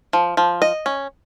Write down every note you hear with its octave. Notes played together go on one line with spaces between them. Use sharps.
F3
F3
D#5
C#4